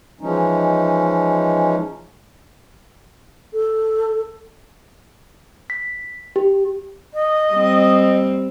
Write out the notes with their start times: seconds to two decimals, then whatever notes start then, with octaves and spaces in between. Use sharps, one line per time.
0.21 E3 F3 G#3 C#4 D#4
3.53 A4
5.70 B6
6.36 G4
7.14 D#5
7.52 G3 C4